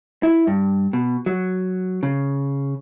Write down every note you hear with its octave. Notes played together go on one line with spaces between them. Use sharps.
E4
G2
B2
F#3
C#3